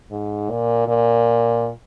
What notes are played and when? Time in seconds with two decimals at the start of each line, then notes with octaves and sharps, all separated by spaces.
0.11 G#2
0.50 A#2
0.88 A#2